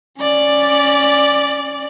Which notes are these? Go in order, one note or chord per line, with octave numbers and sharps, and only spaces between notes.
C#4 D5